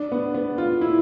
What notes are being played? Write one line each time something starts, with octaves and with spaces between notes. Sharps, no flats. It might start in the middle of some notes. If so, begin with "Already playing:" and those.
Already playing: D4
B3
B3
F4
E4